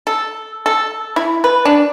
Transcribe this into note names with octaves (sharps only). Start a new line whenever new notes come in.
A4
A4
E4
B4
D4